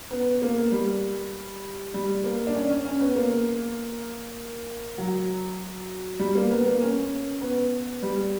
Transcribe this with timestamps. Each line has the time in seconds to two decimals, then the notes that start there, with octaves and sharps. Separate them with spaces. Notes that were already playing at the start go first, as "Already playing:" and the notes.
0.11 B3
0.42 A#3
0.72 G3
1.94 G3
2.24 A#3
2.47 D4
2.55 C#4
2.70 C#4
2.85 C#4
3.01 B3
3.15 A#3
4.98 F#3
6.20 G3
6.35 A#3
6.51 B3
6.66 A#3
6.81 C#4
7.42 B3
8.03 G3